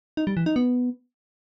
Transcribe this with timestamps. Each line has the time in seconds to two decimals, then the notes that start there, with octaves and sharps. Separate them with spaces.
0.17 D#4
0.27 G3
0.37 E3
0.46 D#4
0.56 B3